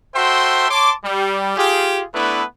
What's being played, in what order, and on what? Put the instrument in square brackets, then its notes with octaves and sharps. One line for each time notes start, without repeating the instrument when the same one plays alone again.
[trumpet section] F#4 A4 C5 E5 G5 C6
C#5 A5 C6 D6
G3
F4 G4 G#4
A3 B3 D4 E4 B4